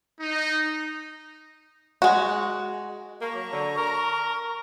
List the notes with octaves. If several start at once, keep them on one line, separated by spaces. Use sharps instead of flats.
D#4
G#3 F#4
A#3 A5 A#5 C#6
F#3
D3
A#4